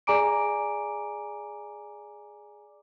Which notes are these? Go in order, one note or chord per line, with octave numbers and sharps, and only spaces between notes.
G#4 D5 G#5 A#5 D6 D7